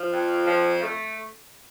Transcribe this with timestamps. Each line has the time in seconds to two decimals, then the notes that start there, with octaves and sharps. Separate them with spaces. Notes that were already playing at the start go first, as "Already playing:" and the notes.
Already playing: F3
0.12 F2
0.46 F3
0.82 A3